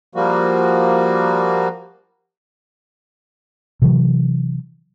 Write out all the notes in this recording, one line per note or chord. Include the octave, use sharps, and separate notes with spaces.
F3 G3 A#3 F#4
C3 E3 F#3